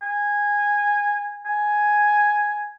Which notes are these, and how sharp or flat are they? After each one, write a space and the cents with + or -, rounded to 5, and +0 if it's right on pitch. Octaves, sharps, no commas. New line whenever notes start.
G#5 -15
G#5 +5